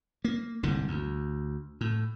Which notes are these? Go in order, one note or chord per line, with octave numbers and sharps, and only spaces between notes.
A#3
G1 C2 G#2 D3
D2
A2